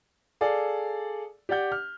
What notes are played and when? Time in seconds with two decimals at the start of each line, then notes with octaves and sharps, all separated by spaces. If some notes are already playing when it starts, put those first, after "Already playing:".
0.41 G#4 A4 D5 F5
1.49 G4 D5 F#5 G6
1.72 F6